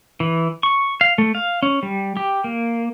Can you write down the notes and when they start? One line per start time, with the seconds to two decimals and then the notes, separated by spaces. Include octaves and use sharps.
0.20 E3
0.63 C#6
1.01 F5
1.18 A3
1.35 F5
1.63 C#4
1.83 G3
2.17 G4
2.44 A#3